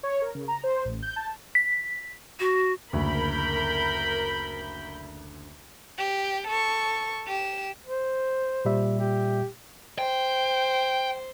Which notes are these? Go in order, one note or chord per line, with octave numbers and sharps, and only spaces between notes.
C#5
A#4
C#3
A#5
C5
A1
G6
A5
B6
F#4
F#1 D2 A#4 B5 G6
G4
A4 C#6
G4 E7
C5
A#2 G3 E5
G4
C5 G5